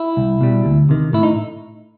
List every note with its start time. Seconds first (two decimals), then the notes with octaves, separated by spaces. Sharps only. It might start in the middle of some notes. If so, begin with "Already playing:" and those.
Already playing: E4
0.17 C2
0.41 B2 G3
0.65 D2
0.89 C3 D#3
1.13 A2 E4
1.23 D#4